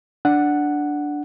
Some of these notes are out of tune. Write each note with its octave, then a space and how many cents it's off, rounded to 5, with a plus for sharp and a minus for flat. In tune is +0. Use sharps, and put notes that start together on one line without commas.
D4 +0 F#5 +0